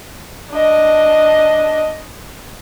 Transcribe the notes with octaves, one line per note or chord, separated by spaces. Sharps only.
D4 D#5